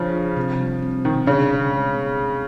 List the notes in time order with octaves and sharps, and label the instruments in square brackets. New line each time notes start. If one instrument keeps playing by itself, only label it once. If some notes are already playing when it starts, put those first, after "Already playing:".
Already playing: [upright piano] C#3 F3 [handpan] D4
[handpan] F4
C3
G3
C4
[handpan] B2 [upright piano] D#3
[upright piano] C#3 [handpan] D4
[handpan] D4
G#3
B3